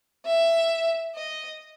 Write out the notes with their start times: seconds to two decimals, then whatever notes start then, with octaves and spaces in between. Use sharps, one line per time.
0.26 E5
1.15 D#5